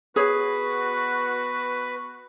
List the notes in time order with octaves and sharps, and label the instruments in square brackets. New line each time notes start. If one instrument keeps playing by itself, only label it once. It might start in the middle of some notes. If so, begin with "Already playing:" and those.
[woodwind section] B3 F#4 [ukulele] G#4 C#5 [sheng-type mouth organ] B4